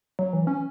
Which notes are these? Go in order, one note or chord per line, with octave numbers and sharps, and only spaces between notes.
F#3
E3
C#4